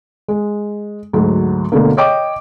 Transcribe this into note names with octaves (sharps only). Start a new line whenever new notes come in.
G#3
D2 G#2 F#3
D2 B2 D3 A#3
C#5 D#5 G5 D6